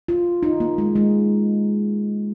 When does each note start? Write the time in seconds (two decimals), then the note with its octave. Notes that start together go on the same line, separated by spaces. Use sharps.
0.08 F4
0.43 D#4
0.60 A#3
0.78 G#3
0.96 G#3